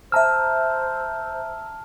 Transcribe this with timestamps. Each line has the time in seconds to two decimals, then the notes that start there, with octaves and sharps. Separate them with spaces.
0.12 C5 E5 A5 A#5 E6 F6